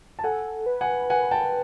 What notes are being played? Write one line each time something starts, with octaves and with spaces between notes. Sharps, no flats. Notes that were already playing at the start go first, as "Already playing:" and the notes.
A5
A4 F#5 G#5
B4
F#5 G#5
F#5 G#5
G5 A5